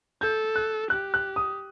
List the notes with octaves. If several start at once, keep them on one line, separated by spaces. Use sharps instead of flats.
A4 G6
F#6
G4 F#6
F#6
D#6